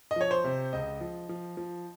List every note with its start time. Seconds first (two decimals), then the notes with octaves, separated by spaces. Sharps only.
0.11 D#5
0.16 F3 C#5
0.31 C5
0.44 C3
0.73 C#2 D#5
1.01 F3
1.29 F3
1.57 F3